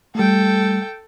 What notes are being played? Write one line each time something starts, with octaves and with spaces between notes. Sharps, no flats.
G3 A3 A4 G5